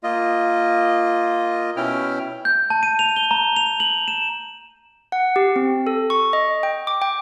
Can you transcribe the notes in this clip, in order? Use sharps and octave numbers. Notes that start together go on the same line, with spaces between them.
A#3 F4 D#5
B2 C#4 E4 G5 F6
G6
A5
D#7
F7
G7
A#5
F7
F#7
E7
F#5
G4
C4
A4
C#6
D#5
G5
D6
G5